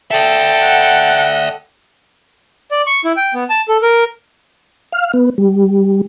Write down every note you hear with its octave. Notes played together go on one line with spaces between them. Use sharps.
A4 D5 E5 G5
F#5
D5
C#6
E4
G5
B3
A5
A4
A#4
F5
B3
G3